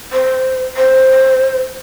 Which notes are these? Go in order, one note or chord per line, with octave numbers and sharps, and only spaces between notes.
C5
C5